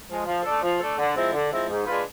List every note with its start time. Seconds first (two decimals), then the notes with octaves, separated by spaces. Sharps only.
0.08 F3 G#3
0.27 F3
0.44 A3 D4 A4
0.62 F3
0.80 A3 D4 A4
0.98 D3
1.15 F3 G#3 C4 E4
1.33 D3
1.51 F3 G#3 C4 E4
1.69 G#2
1.87 G#3 D4 F4 B4